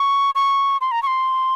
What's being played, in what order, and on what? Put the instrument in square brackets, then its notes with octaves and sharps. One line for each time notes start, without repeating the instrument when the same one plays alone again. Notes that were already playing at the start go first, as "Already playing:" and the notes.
Already playing: [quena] C#6
C#6
C6
A#5
C#6
C6